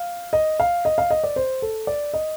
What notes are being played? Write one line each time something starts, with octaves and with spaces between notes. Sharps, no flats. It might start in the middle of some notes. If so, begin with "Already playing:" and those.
Already playing: F5
D#5
F5
D#5
F5
D#5
D5
C5
A4
D5
D#5